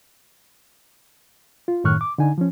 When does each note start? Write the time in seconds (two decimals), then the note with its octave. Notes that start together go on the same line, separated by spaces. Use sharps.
1.68 F4
1.84 F#2 A2 D#3 C#6 F6 F#6
2.01 D6
2.18 D3 D#4 G#5
2.38 F3 C#4